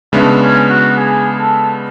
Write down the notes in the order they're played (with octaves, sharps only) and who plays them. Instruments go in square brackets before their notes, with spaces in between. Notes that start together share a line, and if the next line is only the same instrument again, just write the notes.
[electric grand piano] C#3 G#3 B3 D4 [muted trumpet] A3
[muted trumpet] C#4
F#4
G#4
A4